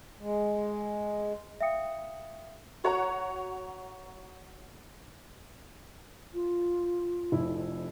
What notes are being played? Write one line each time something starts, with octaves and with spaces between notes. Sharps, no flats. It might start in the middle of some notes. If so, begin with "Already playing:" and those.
G#3
E5 F5 G5 D#6 C#7
F#4 C#5 F#5 A#5
F4
F1 F2 E4